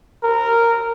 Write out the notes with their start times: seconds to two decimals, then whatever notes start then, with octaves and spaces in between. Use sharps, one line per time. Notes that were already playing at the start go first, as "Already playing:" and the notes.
0.23 A#4